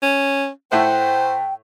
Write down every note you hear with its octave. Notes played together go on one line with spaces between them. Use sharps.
C#4
A2 A3 C5 F#5 G5